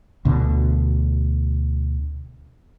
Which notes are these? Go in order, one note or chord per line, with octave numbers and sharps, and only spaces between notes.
D2 B2 D3